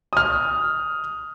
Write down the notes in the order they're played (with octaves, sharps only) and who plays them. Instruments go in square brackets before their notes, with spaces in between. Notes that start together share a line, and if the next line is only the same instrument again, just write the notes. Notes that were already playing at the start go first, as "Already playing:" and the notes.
[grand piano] D#6 F6